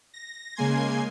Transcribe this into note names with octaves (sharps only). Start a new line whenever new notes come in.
A#6
C#3 G#3 A#3 G#5 C6 G#6